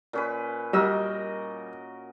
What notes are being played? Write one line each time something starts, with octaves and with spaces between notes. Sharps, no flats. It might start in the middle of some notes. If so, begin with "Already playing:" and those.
A#2 C#4 B4
G3 F#4 A#4 D#5 E6